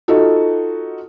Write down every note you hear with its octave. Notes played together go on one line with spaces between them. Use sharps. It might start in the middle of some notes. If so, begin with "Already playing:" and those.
D#4 F4 F#4 A4